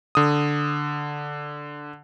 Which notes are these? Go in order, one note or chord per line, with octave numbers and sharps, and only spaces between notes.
D3 D#6